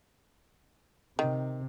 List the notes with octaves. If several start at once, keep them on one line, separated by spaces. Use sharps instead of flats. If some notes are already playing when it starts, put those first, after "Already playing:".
C3 D#3